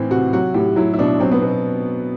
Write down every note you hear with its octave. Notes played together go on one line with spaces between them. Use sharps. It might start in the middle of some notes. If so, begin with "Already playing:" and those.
Already playing: A2 E3 C4
C3 F#4
F#3 F#4
A2 G4
F#3 E4
E4
B2 D4
F#3 C4
B3
B2